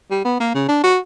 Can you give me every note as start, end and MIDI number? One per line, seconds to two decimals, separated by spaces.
0.10 0.23 55
0.25 0.38 59
0.40 0.51 58
0.54 0.63 49
0.68 0.83 62
0.83 0.98 66